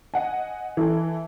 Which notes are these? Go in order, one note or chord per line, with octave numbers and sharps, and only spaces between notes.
D#5 F#5 G#5
E3 A4